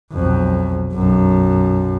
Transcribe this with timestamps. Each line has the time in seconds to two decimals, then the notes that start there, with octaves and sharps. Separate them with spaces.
0.13 B1 F2
0.93 B1 F#2